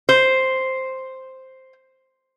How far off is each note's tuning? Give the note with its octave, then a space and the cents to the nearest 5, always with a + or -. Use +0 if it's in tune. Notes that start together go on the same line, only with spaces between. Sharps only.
C5 +0